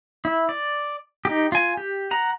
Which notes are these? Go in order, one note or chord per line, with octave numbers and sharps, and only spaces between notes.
E4
D5
D#4 G4
F4 G#5
G4
F#5 A#5